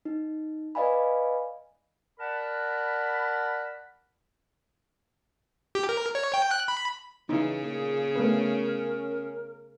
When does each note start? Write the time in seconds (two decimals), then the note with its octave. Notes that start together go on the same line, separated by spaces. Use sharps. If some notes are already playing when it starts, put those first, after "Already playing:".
0.05 D#4
0.75 B4 D5 D#5 F5 G#5 B5
2.20 A#4 D5 F#5 A5 B5
5.75 G4
5.89 A#4
6.15 C#5
6.34 G5
6.51 F#6
6.68 B5
7.29 C#3 E3 D#4 E4
7.63 A#2 A#3 G#4
8.15 A3 B3 C#4 A#4 B4